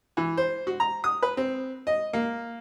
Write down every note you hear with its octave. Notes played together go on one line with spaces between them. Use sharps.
E3
C5
F#4
A#5
D#6
B4
C4
D#5
A#3